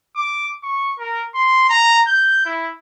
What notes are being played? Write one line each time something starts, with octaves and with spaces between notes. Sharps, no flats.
D6
C#6
A#4
C6
A#5
G6
E4